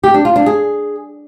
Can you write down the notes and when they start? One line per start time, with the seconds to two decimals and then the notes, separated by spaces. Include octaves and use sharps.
0.04 G4
0.14 D4
0.25 F4
0.36 D4
0.46 G#4